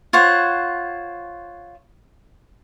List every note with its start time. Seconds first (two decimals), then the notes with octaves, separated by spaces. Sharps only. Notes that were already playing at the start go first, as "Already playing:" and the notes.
0.13 F4 C5 C#5 F#5